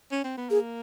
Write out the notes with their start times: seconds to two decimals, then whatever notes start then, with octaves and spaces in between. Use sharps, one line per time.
0.12 C#4
0.24 C4
0.38 B3
0.50 A#3 G#4